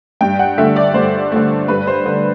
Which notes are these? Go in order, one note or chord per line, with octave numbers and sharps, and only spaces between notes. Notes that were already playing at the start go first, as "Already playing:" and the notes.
G2 G5
F#5
D3 A3 E5
D5
G2 C5
D3 A3
G2 B4
C5
D3 G3